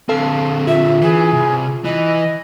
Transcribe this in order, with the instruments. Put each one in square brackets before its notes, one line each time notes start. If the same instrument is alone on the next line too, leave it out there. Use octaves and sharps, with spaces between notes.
[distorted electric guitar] D3 C4 [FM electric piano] A4 F5 A5
[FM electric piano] F4 [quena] E5
[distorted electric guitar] E3 [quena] G#4
[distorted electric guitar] C2
[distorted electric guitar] E3 [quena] D#5